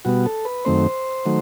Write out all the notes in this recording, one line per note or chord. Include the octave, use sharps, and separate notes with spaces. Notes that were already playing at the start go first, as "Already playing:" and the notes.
B2 G3 B3 F#4
A4
B4
F#2 D#3 A3 C4 C5
D#3 F#3 A3